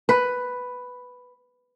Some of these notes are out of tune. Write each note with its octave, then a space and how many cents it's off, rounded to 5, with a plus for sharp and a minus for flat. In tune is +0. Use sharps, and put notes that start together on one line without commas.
B4 +5